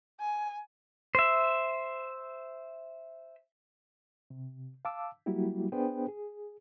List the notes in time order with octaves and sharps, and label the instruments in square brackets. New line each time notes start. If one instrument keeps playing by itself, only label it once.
[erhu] G#5
[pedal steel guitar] C5 E5
[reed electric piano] C3
F5 A5 D6 E6
F#3 G3 A#3 E4 F#4 G4
B3 D4 G#4 B4 C5 G5
G#4